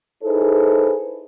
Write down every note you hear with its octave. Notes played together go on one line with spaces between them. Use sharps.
D#4 E4 G#4 A4 B4 C5